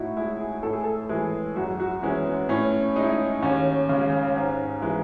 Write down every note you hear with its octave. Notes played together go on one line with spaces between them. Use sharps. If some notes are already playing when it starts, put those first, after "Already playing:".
Already playing: A2 D#4 E4 F#4
G#3 E4
G#4
A2 A4
G#4
A4
E3 G#3 G#4
F#2 F#4
F#4
E3 G#3 C#4
B3
A2 C#4
G#3 D#4
E4
D#4
D#2 C#4
C#3 G#3
G#2
E3 G#3